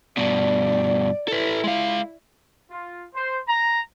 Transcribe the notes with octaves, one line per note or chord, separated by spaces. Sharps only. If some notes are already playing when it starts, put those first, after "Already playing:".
G2 B2 D5
E4 A4 B4
G#3 F5
F4
C5
A#5